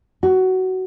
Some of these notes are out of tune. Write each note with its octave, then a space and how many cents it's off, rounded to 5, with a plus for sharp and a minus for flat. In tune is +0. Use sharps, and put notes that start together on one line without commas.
F#4 +15